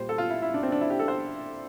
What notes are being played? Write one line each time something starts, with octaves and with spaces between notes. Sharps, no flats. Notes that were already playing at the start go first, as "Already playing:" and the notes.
Already playing: A#2 G3 C5
A4
F4
E4
E4
D4
C4
D4
E4
G4
A4
C5